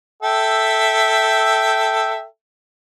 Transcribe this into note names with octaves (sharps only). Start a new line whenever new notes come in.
A4 E5 G5